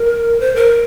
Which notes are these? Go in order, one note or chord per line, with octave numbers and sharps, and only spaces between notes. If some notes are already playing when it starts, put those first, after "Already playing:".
Already playing: A#4
C5
A#4